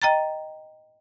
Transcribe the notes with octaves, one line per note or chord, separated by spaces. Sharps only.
D#5 G5 A#5 A6